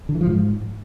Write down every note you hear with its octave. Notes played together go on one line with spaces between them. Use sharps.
D3
E3
F3
G#2